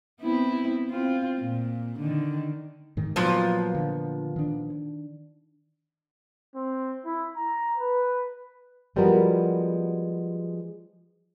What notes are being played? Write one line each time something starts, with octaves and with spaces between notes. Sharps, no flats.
B3 C4 E4
C4 F4
A#2
D3 D#3
G#2 D#3
A#2 F3 F#3 B3
D3
D#3 D4
C4
E4
A#5
B4
F3 G3 G#3 B3 F#4 A#4